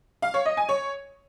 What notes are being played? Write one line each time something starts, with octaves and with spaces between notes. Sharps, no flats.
F5
C#5
D#5
G#5
C#5